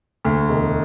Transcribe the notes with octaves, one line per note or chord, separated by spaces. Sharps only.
D2
E1